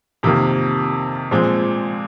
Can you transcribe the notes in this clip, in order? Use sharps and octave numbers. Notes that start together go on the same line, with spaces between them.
F2 C3 D#3 A#3
A#2 F3 G#3 C4